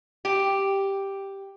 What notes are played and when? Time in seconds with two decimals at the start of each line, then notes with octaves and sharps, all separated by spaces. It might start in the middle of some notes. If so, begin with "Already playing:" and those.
0.25 G4